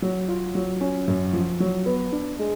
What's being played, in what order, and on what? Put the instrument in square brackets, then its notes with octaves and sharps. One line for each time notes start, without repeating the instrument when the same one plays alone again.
[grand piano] F#3
F4
F#3
C#4
F#2
F3
F#3
B3
D4
G#3